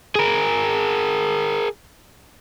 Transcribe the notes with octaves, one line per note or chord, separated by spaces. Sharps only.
G#4 A#4